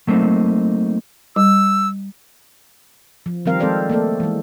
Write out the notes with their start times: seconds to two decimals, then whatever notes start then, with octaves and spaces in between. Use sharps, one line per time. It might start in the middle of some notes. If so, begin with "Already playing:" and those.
0.07 F#3 A3 A#3 C4 D#4
1.36 G3 E6
3.26 F3
3.45 D#3 F3 G3 C4 A#4 F5
3.60 F3 G#3 C4 A4 C5 D5
3.89 A3 A#3 A4 D5
4.20 E3 G#3